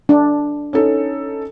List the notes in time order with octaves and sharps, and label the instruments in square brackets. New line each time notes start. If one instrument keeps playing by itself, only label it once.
[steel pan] D4
[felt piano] C#4 D#4 A4